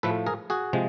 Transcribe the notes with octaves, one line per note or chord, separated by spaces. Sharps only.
A2 F3 A3 A4 B4
G#4 A#4
F#4 G#4
C3 F3 G#3